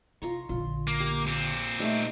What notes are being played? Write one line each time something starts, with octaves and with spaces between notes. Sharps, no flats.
C3 F4 A#5 C#6
A#1 D3 F4
A#3
G4
A#2 C4
G3 A3 D#4 A4